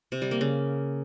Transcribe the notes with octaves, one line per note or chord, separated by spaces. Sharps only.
C3
G3
A#3
C#3